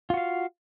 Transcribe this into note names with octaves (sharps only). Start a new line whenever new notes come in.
F4 F#4 F5